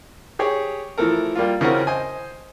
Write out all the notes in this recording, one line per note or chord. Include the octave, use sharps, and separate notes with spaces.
G4 G#4 C#5
E3 F3 A3 A4 A#4
G3 A#3 F4
C#3 E3 C4 C#4 F#4 A#4
C5 D#5 G#5